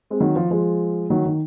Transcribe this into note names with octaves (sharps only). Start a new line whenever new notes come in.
G#3 C4
D#3 F#3
F3
F3 G#3
D#3 F#3
D#3